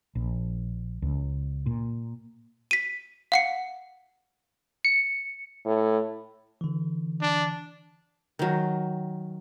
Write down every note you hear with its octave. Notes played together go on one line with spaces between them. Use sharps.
A#1
C#2
A#2
B6 D#7
F5 F#5 C#7
C#7
A2
D3 E3
D4
D#3 F#3